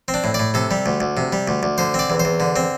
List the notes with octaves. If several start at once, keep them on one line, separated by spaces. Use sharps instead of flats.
C4
D4
A2
A2 D5
C3 A4
G3
D2
D2
C3
G3
D2
D2
D3 C5
C4 D5
E2
C5
E2
D3
C4